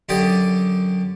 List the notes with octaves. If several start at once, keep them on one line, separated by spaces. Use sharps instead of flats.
F#2 D3 G4 D5 D#6